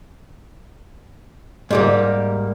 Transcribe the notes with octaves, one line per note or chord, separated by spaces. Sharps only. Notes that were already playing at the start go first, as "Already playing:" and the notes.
G#2 G3 A#3